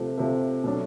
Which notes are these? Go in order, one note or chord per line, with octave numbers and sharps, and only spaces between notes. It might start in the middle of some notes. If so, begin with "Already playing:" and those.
Already playing: C3 F3 A3
C3 F3 A3
B2 F#3 A3 D4